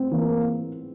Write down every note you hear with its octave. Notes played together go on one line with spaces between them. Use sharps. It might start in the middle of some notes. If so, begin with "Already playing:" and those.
Already playing: C4
E3 A#3